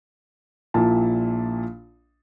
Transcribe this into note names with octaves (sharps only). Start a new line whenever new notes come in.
A#1 A#2 E4 A5